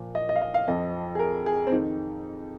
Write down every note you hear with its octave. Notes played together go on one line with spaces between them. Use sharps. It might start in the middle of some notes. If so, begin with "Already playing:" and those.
Already playing: A#2 F3
D#5
D#5
F5
D#5
F5
F2 F3 D#5
G#4
A#4
G#4
C4
F2 D#3 D#4